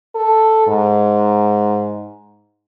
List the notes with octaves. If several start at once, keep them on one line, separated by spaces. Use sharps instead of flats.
A4
G#2